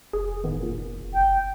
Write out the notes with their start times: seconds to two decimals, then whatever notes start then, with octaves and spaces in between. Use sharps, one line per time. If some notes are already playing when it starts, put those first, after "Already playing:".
0.13 F1 G#4
0.44 A1 D#3 B3
0.63 A#2
1.14 G1 G5